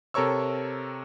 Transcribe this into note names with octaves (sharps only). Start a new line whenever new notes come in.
C3 A4 A#4 C#5 C#6 E6